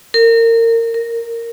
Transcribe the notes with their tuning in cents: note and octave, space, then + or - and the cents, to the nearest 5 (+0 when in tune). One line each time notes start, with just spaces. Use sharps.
A#4 -30
A#4 -5